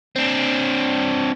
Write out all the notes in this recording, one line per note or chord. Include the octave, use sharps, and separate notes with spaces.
C4 D4